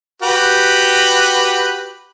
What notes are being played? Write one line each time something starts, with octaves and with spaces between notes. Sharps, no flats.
F#4 G4 B4